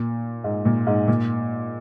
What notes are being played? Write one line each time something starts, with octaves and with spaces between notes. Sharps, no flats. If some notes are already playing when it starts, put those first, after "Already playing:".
Already playing: A#2
G#2
A#2
G#2
A#2